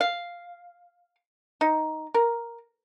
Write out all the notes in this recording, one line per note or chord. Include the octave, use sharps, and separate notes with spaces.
F5
D#4
A#4